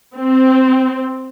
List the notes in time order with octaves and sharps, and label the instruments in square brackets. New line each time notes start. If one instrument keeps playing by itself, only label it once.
[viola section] C4